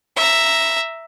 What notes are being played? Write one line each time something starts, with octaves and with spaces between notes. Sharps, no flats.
E5 A#5